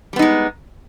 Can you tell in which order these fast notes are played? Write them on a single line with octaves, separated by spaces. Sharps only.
G3 B3 D#4 G#3